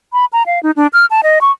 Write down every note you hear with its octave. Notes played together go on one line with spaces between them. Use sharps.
B5
A#5
F5
D#4
D4
F6
A5
D#5
C#6